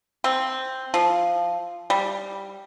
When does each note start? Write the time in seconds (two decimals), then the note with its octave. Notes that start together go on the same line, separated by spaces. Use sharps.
0.24 C4
0.94 F3
1.90 G3